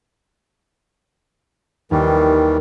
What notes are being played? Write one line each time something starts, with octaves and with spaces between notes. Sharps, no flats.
D#2 D#3 E3 G3